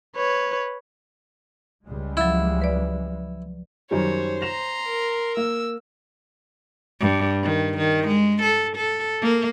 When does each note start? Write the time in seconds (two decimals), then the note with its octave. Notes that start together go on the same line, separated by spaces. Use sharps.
0.16 B4 C#5
1.86 C#2 G3 G#3
2.17 F3 F#3 E4
2.62 B4 D5
3.91 F#2 D#3 G3 C5 C#5
4.42 A#5 C6 A#6 E7 F7
4.85 A#4
5.37 A#3 E6
7.01 G2
7.43 D#3
7.77 D#3
8.07 G#3
8.42 A4
8.76 A4
9.22 A#3